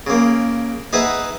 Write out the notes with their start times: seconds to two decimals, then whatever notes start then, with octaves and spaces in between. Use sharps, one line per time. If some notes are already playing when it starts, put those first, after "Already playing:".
0.07 C#3 A#3
0.93 D#4 G#4 B4 E5 F#5